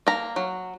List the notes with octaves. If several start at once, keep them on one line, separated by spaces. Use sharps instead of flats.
A#3 A#5
F#3